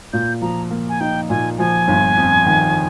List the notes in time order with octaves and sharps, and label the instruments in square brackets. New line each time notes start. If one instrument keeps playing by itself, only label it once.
[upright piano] A#2 [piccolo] G6
[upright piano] F3 [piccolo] A#5
[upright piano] A#3
[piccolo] G#5
[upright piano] D#4 [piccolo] G5
[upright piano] A#2 [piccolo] G#5
[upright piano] F3 [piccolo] G#5
[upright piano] G1
F2
D#3